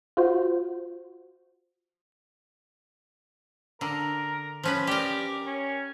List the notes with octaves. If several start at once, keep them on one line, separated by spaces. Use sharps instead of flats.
F4 F#4 C5
D3 A#4
F3 C#4 B4
G4 A#4 D5
C#4